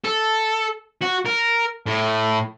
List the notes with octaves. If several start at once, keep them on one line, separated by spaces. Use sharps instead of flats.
A4
F#4
A#4
A2